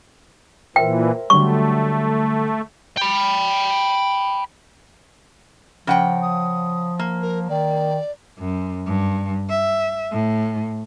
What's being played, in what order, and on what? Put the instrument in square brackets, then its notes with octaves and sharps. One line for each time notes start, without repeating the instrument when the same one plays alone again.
[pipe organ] A#2 E3 [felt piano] A#4 C5 E5 [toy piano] G5
[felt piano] D3 F#3 G3 [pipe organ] A3 [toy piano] C#6
[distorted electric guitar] G5 B5
[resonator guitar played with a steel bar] C#3 F#5 G5 [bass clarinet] F3
[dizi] D#6
[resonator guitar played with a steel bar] A#3
[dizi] A#4
[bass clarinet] D#3 [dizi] D5
[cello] F#2
G2
E5
A2